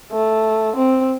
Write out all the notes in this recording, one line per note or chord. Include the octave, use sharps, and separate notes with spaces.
A3
C4